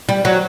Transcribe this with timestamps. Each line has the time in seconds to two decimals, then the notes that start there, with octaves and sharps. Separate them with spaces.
0.09 G3
0.25 F#3